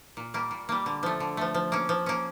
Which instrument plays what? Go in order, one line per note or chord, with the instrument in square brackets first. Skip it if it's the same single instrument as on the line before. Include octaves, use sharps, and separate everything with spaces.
[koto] A#2
G3 A#3
A#2
G3 A#3
D3
F3 A3
D3
F3 A3
F3
A#3 C#4
F3
A#3 C#4